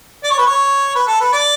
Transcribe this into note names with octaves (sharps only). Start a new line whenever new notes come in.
D5
C#5
B4
C#5
B4
A4
B4
D5